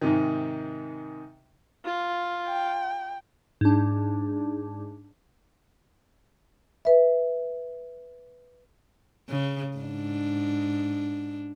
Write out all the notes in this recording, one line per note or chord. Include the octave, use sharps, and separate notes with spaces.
G#2 C3 D#3
F4
G5
G#2 D4
B4 E5
C#3
G#2 D4